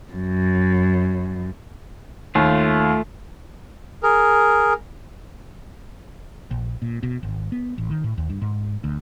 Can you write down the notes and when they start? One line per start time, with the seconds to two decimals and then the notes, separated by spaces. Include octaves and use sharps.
0.13 F#2
2.35 D#2 A3 F4
4.03 G#4 A#4
6.51 A#1
6.82 A#2
7.03 B2
7.23 G#1
7.52 B3
7.78 A1
7.90 D#3
8.04 A2
8.18 D#2
8.29 G2
8.42 G#2
8.84 D2